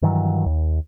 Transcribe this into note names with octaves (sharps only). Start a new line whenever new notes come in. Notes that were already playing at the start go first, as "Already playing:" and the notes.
G2 D#3 E3 F#3
D#2